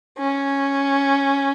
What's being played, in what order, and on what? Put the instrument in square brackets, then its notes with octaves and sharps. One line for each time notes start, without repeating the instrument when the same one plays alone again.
[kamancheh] C#4